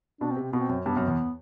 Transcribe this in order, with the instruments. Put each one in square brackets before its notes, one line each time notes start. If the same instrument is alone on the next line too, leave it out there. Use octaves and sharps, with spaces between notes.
[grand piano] B2 [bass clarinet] D4
[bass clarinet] C4
[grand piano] C3
[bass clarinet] C4
[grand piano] B2 [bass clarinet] B3
[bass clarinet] C4
[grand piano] F#2
[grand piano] G2 [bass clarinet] B3
[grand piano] F#2
E2